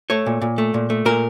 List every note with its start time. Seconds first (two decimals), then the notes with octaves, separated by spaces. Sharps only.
0.10 A3 C#5
0.26 A#2
0.42 A#2
0.58 A3
0.74 A#2
0.90 A3
1.05 A#2 A#4